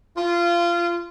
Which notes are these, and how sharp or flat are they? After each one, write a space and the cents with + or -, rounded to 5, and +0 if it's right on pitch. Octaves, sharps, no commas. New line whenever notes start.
F4 -20